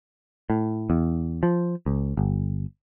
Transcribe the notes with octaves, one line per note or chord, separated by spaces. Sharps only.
A2
E2
F3
C#2
G1